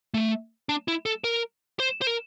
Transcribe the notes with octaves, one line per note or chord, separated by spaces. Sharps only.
A3
D4
E4
A4
A#4
C5
C5
A#4